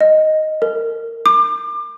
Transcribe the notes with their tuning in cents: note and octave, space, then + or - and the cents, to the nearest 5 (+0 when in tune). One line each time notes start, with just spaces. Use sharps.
D#5 +0
A#4 -25
D6 +30